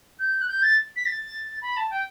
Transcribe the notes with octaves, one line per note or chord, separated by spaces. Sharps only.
G6
F#6
G6
A6
B6
A6
B5
A5
G5